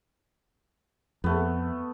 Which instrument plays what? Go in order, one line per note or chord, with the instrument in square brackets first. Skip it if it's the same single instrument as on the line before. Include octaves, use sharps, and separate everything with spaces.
[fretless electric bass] F2 [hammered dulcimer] A3 B3